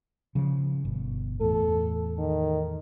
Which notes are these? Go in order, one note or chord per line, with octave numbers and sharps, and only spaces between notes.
C#3 F3
G1 B2
E2 A2 A4
D#3